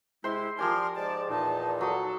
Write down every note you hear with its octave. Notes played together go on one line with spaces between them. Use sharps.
C3 G#3 E4 C5 C6
F3 G4 A#4 D5 G#5 C6 F6
G#2 D5 A5
E2 A#2 D#4 A5
F#3 A4 D#6